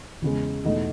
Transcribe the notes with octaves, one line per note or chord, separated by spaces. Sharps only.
E2 C#3 G#3
E2 B2 A3 D#4